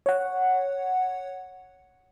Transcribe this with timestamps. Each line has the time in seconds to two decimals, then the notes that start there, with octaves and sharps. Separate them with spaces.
0.06 C#5 F#5